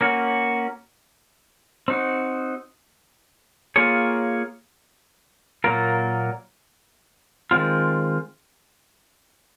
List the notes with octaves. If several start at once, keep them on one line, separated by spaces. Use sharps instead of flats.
A#3 C#4 F#4
C4 D#4 F#4
A#3 F4 G#4 C#5
A#2 F#3 A#3 F4 A#4
D#3 G#3 C4 F4